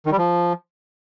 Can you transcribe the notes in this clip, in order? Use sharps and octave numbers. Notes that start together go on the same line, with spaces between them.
D#3
G3
F3